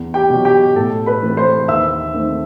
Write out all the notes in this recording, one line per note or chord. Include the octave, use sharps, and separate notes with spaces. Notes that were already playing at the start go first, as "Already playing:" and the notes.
Already playing: E2
G4 G5
B2 F#3
G4 G5
A2 A4 A5
B4 B5
E3 A3 C4
C5 C6
D#2 E5 E6
D#3 A3 C4